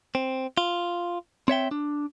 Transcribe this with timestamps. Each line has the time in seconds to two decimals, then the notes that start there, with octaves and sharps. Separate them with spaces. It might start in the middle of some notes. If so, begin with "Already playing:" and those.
0.15 C4
0.57 F4
1.48 C4 C#5 E5 G5
1.71 D4